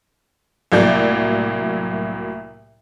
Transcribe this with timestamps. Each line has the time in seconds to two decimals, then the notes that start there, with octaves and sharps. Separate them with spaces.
0.72 C2 A2 F#3 A#3 D5 G6